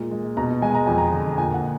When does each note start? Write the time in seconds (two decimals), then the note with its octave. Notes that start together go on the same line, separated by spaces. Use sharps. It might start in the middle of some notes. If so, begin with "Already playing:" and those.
Already playing: A#2 G#3
0.11 G#3
0.37 B2 A#5
0.62 G#3 G#5
0.75 A#5
0.86 F2 G#5
0.98 A#5
1.12 D3
1.38 A#2 G#5
1.54 F#5